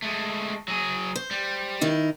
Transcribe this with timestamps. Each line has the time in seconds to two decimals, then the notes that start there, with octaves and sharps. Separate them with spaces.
0.02 G#3 A3
0.68 F#3 G#4
1.15 C5
1.31 G3
1.81 D#3 D#4 E4